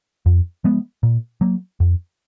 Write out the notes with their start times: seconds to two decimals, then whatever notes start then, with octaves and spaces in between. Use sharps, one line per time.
0.26 F2
0.64 F3 G#3 B3
1.03 A#2
1.41 F#3 A#3
1.80 F2